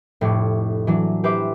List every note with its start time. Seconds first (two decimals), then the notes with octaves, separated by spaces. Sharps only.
0.21 F1 A2 D5 C#6
0.87 E3 F#3 D4
1.24 G4 B4 C5 E5 D6